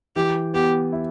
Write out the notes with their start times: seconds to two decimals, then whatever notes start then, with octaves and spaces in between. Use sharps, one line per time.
0.16 E3 G4
0.54 B3 G4
0.92 E4